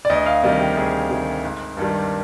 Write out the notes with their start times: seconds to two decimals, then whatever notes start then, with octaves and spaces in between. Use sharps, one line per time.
0.05 D5
0.10 D2 D#5
0.26 F5
0.43 C3 D#3 G3 D#5
0.60 G4
0.77 D2 G#4
1.10 C3 D#3 G3
1.44 G#1
1.77 G2 D#3 G3